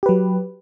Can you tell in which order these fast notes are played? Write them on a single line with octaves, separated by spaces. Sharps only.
G4 B4 F#3